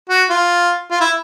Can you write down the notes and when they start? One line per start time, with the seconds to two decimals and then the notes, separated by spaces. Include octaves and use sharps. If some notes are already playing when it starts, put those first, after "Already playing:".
0.10 F#4
0.30 F4
0.91 F4
1.01 E4